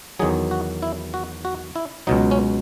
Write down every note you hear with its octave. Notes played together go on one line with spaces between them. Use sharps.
E2 D#3 F#3 G#4
F#4
E4
F#4
F#4
E4
C#2 B2 F#3 D#4
C#4